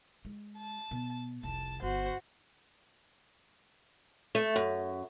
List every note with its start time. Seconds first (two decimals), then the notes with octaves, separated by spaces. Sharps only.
0.25 G#3
0.58 A5
0.91 B2
1.43 F1 C2 A5
1.82 G1 F#4 C5
4.35 A3
4.56 F#2